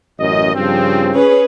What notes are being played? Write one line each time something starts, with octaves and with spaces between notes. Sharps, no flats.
A1 F#2 D#5
G2 C#3 F3 C4
C#4 G#4 B4